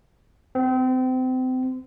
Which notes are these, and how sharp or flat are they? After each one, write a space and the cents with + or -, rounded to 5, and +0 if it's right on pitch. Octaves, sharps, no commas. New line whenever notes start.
C4 -30